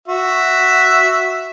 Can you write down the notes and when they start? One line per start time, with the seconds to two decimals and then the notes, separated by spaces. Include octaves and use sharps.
0.08 F#4 E5